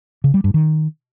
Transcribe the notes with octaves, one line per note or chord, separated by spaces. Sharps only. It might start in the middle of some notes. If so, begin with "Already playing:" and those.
C#3
G3
G2
D#3